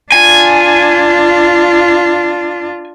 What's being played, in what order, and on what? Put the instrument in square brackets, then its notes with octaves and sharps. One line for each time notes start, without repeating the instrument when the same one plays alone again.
[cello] D4 F4 [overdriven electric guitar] G#5